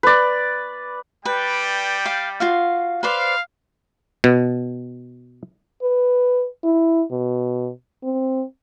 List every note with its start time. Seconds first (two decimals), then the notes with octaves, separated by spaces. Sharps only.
0.03 B4 D5
1.25 G3 B4 D5 G5
2.06 F5
2.40 F4 F#4 F5
3.03 B4 C5 D5 F5
4.24 B2
5.82 B4
6.64 E4
7.11 B2
8.03 C4